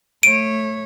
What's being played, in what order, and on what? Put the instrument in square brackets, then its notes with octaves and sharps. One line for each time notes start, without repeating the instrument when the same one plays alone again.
[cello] A3 C#5 [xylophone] D7 D#7